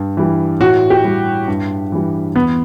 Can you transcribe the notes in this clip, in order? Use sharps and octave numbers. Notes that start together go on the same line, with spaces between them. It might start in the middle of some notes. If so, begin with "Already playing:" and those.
Already playing: G2
E3 G3
A2 F#4
G4
G3
G2
E3 G3
E2 B3